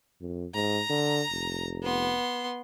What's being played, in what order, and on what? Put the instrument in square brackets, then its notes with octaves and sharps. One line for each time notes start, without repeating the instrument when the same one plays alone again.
[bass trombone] F2
[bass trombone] G#2 [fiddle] A#5
[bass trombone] D3
F1
[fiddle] B3 C6